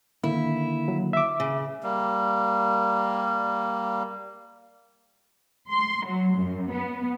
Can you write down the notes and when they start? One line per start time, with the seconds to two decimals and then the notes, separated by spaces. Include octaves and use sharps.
0.24 D3 D#3 A#3 E4
0.88 F#3
1.13 E5 D6
1.40 C#3
1.83 G3 A#3
5.71 C6
6.05 F#3
6.36 F#2
6.73 B3